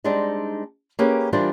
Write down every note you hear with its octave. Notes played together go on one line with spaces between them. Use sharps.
G3 G#3 C4 D4 D#4
A#3 C#4 G4 G#4 A#4 B4
E3 G3 D4 F4 A#4 C5